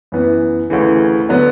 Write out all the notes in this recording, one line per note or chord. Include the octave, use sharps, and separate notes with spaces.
F#2 E3 B3
D2 C#3 E3
D3 F#3 B3